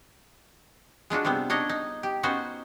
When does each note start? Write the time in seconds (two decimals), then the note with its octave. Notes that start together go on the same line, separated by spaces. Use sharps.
1.10 G#3 D4 F4 F#4
1.25 C3 G3 B3 C4
1.50 D4 D#4 C#5 D#5
1.69 D#4
2.03 G4
2.23 B3 C#4 D#4 F#4 C5